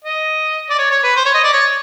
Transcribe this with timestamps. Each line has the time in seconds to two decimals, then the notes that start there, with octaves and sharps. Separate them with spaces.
0.04 D#5
0.70 D5
0.78 C#5
0.91 C#5
1.04 B4
1.16 C5
1.25 C#5
1.34 D#5
1.44 D5
1.53 C#5